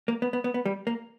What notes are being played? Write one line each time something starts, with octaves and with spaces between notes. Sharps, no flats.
A#3
B3
B3
B3
B3
G3
A#3